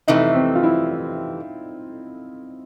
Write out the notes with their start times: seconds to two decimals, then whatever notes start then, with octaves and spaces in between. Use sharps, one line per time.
0.08 F2 C3 E3 A3 D#4
0.35 C4
0.55 F4
0.63 E4